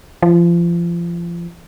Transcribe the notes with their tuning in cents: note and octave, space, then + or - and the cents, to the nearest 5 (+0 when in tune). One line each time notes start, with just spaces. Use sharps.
F3 -30